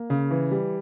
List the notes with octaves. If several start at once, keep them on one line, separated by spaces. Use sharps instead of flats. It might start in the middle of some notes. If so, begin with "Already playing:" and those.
Already playing: A#3
C#3
E3
G3